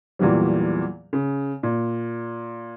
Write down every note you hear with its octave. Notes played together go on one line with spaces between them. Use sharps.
E2 A#2 E3 F#3 G3
C#3
A#2